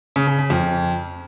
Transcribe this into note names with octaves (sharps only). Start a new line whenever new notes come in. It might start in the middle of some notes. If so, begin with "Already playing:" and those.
C#3
C#3
C#3
F2